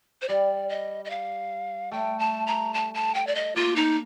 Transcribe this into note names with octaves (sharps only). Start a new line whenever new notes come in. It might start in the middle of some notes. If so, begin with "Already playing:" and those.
C5
G3 D5
D#5
D#5
F5
A3 G5
A5
A#5
A5
A5
G5
D5
D#5
A#3 F4
D#4